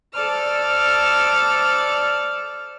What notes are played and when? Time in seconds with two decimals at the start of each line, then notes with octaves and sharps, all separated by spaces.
0.13 A4 C5 D5 F6